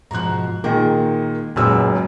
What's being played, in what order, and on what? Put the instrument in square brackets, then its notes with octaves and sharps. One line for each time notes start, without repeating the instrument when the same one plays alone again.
[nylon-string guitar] G#2 B2 F3 [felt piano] A#5 F#6
[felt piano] A#2 D#3 G#3 [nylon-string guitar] A#4
[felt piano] F#1 F#2 E6 [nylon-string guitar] A#2 G#3 B3